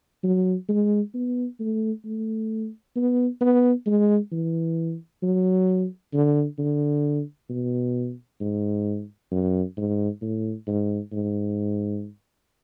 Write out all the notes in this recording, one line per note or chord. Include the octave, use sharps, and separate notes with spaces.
F#3
G#3
B3
A3
A3
B3
B3
G#3
E3
F#3
D3
D3
B2
G#2
F#2
G#2
A2
G#2
G#2